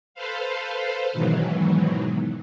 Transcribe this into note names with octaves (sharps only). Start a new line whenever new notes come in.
A4 B4 C5 F5
G#2 B2 D#3 E3 F#3